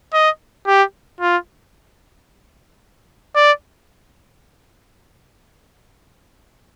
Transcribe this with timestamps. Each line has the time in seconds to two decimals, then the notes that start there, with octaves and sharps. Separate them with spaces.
0.13 D#5
0.67 G4
1.21 F4
3.36 D5